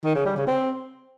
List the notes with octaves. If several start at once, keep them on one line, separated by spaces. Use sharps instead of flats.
D#3
C#3
G3
C#3
C4